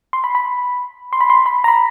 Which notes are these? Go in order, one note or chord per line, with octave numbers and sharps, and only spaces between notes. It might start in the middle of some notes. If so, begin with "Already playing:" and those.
C6
B5
B5
C6
B5
C6
B5
A#5
B5